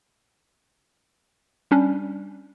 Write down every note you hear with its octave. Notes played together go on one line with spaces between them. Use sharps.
G3 C#4 D4